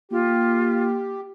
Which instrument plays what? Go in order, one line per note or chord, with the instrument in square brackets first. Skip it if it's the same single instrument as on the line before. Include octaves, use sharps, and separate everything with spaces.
[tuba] A#3 [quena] F4 [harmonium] G4